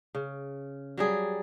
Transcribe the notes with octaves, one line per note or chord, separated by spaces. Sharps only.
C#3
F#3 G3 G#4